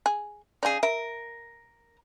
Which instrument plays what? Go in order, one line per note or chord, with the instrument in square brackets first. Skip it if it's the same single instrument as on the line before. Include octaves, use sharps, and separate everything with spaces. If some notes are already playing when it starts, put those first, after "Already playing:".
[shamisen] G#4
[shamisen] C#3 D5 [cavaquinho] D#4 G#4
[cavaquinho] A#4 [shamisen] E5